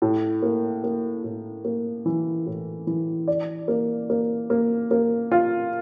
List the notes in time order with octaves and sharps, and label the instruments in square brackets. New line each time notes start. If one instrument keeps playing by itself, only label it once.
[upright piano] A2
A#3
A#3
A2
A#3
E3
A2
E3
D5
A#3
A#3
A#3
A#3
F4